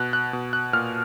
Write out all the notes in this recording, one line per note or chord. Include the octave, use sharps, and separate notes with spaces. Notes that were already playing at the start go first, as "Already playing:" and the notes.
Already playing: B2 F#6
F#6
B2
F#6
A#2 F6